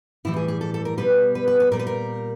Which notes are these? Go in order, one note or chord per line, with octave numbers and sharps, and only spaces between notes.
A2 E3 G3 E4
G#4
G#4
A4
A4
A#4
B2 G3 B4
B4
B4
B4
A#2 G3 A#4
B4
A#4